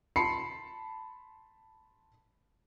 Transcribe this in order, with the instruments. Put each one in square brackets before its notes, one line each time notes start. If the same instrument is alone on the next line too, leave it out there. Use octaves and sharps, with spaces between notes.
[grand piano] A5 B5 C6 C7 C#7